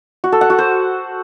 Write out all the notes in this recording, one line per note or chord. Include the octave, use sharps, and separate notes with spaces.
F#4
A4
F#5
F#4
C5